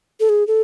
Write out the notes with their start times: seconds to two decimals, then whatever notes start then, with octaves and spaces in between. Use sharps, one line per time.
0.20 A4
0.29 G#4
0.47 A4